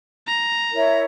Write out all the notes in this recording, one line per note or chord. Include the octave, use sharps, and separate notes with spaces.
A#5
E4 A#4 C#5 E5